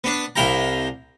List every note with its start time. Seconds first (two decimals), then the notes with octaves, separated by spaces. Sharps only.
0.04 B3 D4
0.36 C2 E4 F5 G5 A#5